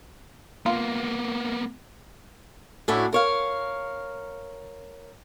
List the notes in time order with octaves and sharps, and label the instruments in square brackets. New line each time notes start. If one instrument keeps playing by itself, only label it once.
[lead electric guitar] A#3 B3 [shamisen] F4
[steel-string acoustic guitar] A2 C#4 D4 E4 F#4
A#4 C#5 F5